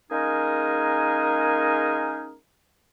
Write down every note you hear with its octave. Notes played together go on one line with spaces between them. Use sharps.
G#3 A#3 C#4 D#4 G#4 A#4